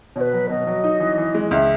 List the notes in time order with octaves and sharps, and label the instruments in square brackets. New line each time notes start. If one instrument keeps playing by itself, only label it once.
[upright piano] B2 [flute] C#5
[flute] B4
[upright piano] F#3
[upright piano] B2 [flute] D#5
[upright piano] F#3
D#4
E3
E3
G#3
[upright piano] C#2 [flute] E5